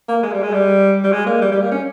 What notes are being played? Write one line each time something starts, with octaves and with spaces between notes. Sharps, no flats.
A#3
G#3
G3
G#3
G3
G3
G#3
A#3
G3
G3
A#3
C#4